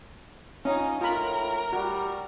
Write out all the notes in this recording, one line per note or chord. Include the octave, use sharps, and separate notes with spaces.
C#4 D#4 F4
A2 F4 A#4 B5
G3 F#4